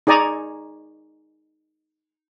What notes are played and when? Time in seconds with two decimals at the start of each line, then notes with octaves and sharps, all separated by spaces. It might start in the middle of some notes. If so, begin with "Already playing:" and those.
0.07 D#4 G#4 D5 G#5 A#5 C#6